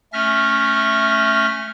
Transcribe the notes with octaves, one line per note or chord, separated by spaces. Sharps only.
A3 C#4 E5 F6 A#6